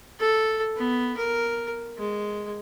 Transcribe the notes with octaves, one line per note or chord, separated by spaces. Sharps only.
A4
B3
A#4
G#3